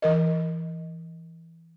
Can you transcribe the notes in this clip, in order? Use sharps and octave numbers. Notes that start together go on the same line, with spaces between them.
E3 A#4 D#5